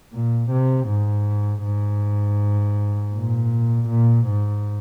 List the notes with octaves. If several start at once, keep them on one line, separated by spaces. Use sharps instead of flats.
A#2
C3
G#2
G#2
A#2
A#2
G#2